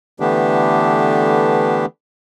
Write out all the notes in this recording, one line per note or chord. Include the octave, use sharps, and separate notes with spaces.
D3 E3 A3 B3 D4 G4